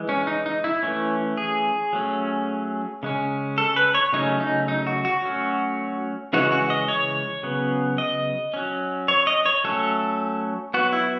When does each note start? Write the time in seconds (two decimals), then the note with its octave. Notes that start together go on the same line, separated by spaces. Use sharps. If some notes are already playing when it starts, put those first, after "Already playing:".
Already playing: E3 G#3
0.09 C#4
0.27 D#4
0.46 D#4
0.64 E4
0.83 E3 A3 C#4
1.37 G#4
1.93 F#3 A3 C#4
3.03 C#3 G#3 C#4
3.58 A4
3.76 B4
3.95 C#5
4.13 C#3 F#3 A3 C#4 D#4
4.40 D#4
4.68 D#4
4.87 F#4
5.05 F#4
5.23 F#3 A3 C#4
6.33 C#3 E3 G#3 C#4 F#4
6.52 F#4
6.70 D#5
6.88 C#5
7.43 C#3 F#3 B3
7.98 D#5
8.54 F#3 C#4
9.08 C#5
9.27 D#5
9.46 C#5
9.64 F#3 A3 C#4 A4
10.74 F#3 B3 F#4
10.93 E4